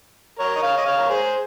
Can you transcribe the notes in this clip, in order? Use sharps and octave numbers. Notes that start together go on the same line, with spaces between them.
A#4 C#5
D#5
C#5 F5
D#5
C#5 F5
A#4
G#4 C5